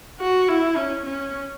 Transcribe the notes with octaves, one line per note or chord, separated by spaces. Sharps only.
F#4
E4
C#4
C#4